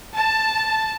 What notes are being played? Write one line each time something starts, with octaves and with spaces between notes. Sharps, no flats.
A5